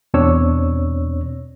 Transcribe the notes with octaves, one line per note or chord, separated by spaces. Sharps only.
E2 B2 C4 D4 C#5 E6